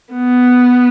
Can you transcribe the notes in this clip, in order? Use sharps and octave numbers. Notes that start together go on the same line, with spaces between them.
B3